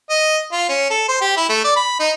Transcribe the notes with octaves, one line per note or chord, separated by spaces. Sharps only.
D#5
F4
C#4
A4
C5
G4
E4
A3
D5
B5
D#4